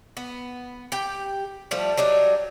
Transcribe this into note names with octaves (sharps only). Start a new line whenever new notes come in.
B3
G4 G5
F3 G3 A3
F#3 G3 D4 D#4